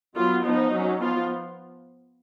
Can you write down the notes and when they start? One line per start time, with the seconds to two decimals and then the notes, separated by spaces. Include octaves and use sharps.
0.15 F#3 B3 F4
0.44 F3 B3 D#4
0.71 F#3 C#4
1.00 F3 B3 F4